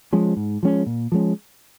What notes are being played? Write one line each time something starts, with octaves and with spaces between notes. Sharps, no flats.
F3 G#3 C#4
G#2
F3 G#3 C#4
A#2
F3 G#3 C#4